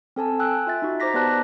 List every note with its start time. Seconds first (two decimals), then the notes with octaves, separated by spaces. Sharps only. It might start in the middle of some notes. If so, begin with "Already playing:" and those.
0.16 C4 A4 G#5 A5
0.39 G5 G#5 E6 F#6
0.67 F4 E5 A6
0.82 D#4 F#4
1.00 D#4 C5 A#5 D6 A#6 B6
1.14 B3 G4 B4 D5 A5 F#6